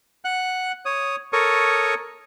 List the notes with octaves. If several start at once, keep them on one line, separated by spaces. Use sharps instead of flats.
F#5 F#6
C#5 D#6
A4 A#4 C#5 C#6 D#6